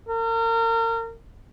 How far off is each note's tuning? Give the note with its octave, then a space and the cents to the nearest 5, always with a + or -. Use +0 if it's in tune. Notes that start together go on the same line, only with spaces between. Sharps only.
A#4 -35